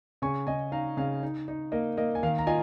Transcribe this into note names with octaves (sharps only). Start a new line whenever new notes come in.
C#3 G#5 C#6
C#3 D#5 G#5
D#4 F5 A#5
C#3 F5
D#4
D#4
A#3 D#5
A#3 D#5
G#5
D#3 F5
A#5
F4 D#5 G#5